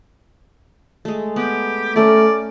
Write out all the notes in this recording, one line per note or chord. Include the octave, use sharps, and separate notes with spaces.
G#3 A3
B3 G4
A3 C#4 A4 A#4 D5